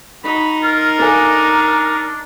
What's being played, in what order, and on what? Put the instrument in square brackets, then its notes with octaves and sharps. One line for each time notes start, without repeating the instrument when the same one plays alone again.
[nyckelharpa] D#4 [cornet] F#4 [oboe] B5
[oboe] F4 [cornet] A#4
[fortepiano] A#3 A4 G#5 [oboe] D4